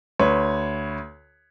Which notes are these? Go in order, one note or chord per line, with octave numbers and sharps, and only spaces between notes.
D2 B4 C#5